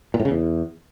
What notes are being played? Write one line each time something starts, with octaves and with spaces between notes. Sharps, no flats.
A#2
A2
C#3
E2